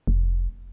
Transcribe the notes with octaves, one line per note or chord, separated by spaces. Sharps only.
F1